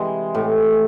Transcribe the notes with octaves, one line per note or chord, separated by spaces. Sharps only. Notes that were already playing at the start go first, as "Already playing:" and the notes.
Already playing: C3 E3 G#3
A2